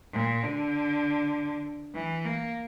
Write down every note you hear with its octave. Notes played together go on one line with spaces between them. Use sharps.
A#2
D3
E3
A#3